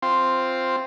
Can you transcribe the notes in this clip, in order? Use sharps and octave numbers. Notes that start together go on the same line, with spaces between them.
C4 F4